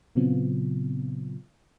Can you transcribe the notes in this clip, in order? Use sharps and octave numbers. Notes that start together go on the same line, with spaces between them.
A#2 C#3 F#3 B3 C4 F4